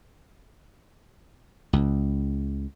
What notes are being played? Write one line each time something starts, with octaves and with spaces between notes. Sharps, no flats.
C#2